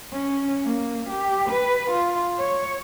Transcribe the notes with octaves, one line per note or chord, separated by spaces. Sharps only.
C#4
A#3
G4
B4
F4
C#5